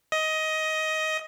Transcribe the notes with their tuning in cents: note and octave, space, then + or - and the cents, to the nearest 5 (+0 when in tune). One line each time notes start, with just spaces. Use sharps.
D#5 +15